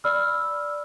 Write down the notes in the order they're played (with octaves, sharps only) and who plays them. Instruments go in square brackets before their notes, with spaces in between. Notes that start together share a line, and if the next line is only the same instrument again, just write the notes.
[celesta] D5 B5 E6 F6